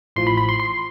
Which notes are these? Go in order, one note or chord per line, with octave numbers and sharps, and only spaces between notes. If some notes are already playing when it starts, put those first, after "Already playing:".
A1 A2 F3 C6
B5
B5
C6
C6